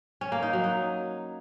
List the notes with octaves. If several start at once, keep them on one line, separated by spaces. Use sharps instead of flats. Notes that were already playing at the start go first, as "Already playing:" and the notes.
C#4
A#3
D#4
F#3
D#4